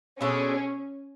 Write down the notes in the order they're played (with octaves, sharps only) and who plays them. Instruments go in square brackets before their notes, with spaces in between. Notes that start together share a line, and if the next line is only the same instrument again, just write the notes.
[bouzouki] B2 G#3 D4 A4 [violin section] C#4